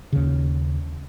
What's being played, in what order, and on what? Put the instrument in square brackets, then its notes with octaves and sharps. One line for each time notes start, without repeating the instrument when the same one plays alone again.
[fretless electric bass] D#2 C#3